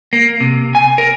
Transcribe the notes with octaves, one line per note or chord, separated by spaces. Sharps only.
A#3
C3
G#5
A#4